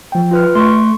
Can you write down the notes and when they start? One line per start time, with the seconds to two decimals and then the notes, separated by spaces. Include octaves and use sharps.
0.12 F3 G5
0.31 F4 B4 F6
0.55 A3 C6 C#6